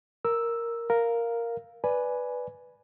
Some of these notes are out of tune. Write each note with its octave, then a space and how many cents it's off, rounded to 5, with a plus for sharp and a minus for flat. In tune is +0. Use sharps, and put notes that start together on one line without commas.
A#4 +0 E6 +0
A#4 +0 F5 +0
B4 +0 D5 +0 G#5 +10